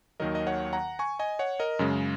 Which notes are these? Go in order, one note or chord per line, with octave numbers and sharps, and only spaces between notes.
D#2 D#3 F#3 A#4 D#5
D#5
C#5 F#5
F#5 A#5
G#5 C#6
D#5 G#5
C#5 F#5
A#4 D#5
F#2 C#3 G#3